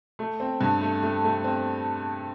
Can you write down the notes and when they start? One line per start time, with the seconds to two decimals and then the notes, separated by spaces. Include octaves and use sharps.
0.19 A3
0.40 C4
0.61 G2
0.81 A3
1.03 A3
1.24 A3
1.44 C4